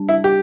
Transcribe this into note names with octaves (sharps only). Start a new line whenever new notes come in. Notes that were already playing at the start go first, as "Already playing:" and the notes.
Already playing: G3 D4
E4
G4